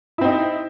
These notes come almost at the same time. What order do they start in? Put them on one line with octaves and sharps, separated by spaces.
E4 C4 D#4